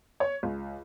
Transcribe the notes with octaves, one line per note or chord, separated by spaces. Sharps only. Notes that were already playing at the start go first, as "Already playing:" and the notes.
C#5
C#2